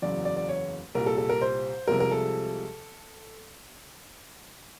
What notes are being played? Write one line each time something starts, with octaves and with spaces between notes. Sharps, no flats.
F#1 E2 C#3 F#3 D5
D5
D5
C#5
C2 A#2 G3 A#4
A4
A4
A#4
C5
C2 C3 F3 G#3 A#4
A#4
A4